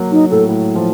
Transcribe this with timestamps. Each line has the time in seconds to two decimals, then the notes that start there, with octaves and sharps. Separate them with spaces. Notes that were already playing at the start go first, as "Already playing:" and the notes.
Already playing: F#3 A#3
0.12 F#3 D#4
0.31 A2 A4
0.49 A2
0.75 F3